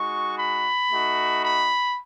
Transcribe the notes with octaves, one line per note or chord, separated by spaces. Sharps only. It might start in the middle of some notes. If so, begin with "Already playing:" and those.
Already playing: G#3 D#4 F#4 C#6
B5
A3 D#4 F#4
B5